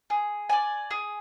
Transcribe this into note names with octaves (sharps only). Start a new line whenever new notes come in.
G#4
D5 G#5
G#4